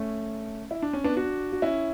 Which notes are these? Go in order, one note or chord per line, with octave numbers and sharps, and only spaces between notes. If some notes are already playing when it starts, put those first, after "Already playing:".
Already playing: A3 C#4
E4
D4
C#4
B3 D4
D4 F#4
F#4
C#4 E4